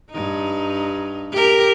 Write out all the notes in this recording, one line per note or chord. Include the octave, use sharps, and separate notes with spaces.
G2 D#4
G4 A#4